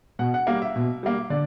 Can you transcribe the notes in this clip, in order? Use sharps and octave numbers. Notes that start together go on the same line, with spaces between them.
B2 F#5
F#5
G3 A#3 F5
E5
B2
G3 A#3
D3 D5